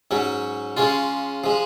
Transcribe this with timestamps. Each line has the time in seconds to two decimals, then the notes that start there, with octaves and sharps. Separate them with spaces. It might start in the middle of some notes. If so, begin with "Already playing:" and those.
0.11 G#2 F#3 C#4
0.77 C#3 G#3 C#4 F4
1.44 F3 G#3